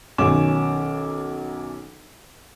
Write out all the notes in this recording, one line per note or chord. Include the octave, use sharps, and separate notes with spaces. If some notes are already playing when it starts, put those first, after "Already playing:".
B1 D#3 C#4 D6 E7